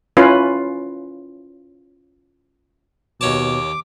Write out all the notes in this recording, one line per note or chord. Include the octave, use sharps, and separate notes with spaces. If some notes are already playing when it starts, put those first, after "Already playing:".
C#4 E4 F4 B4
D#2 B2 C#5 A5 D6